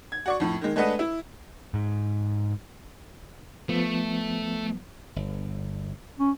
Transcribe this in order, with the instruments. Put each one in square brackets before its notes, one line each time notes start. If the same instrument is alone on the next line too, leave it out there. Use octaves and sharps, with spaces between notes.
[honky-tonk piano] G#6
F#4 D5 C#6
F2 A2
D#3 G#3
G#3 A3 D4 B4 D#5 F#5
E4
[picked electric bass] G#2
[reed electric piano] F3 B3 [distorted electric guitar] A3
[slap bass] G1
[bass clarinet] C#4